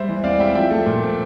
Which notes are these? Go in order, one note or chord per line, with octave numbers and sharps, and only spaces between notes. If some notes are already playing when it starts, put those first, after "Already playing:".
Already playing: G3 C5 E5
E3
C4 D5 F5
G3 E5 G5
F3 E5 G5
A3
A#2
C4